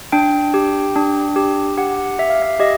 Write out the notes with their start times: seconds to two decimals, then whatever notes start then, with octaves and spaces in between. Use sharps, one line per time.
0.12 D4 G5
0.54 G4
0.96 D4
1.36 G4
1.77 G4 F#5
2.19 G4 E5
2.30 F5
2.42 E5
2.60 G4 D#5